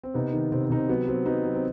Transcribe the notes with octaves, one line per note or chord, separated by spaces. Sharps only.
C4
C3 B3 D#4
D#3
C3 C4
C4
C3 D#4
C4
F#3 B3
F#3 C4
F#3 B3 D#4
F#3
C4